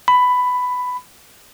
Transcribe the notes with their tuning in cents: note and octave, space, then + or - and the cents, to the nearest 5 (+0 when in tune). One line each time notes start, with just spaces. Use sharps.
B5 +10